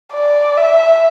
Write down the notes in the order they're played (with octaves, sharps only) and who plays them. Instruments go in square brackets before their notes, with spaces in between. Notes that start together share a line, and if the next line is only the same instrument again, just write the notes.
[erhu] D5
E5